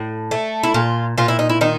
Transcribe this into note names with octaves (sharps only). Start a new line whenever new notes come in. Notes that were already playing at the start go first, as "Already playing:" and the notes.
Already playing: A2
A3
E4
A#2 F4
A#2 F4
E4
D#4
E4
D#3 D#4